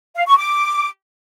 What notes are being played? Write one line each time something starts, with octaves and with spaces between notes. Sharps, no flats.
F5
C#6
D6